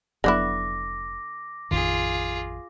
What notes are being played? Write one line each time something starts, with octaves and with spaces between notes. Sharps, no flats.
F1 D3 F#3 B3 E4 D6 A#6
A1 F2 D#3 F4 G#4